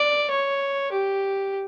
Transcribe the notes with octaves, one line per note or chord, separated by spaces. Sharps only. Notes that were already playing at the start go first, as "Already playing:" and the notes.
Already playing: D5
C#5
G4